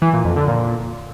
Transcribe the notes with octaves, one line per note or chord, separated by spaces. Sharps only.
E3
A#2
F2
D3
A#2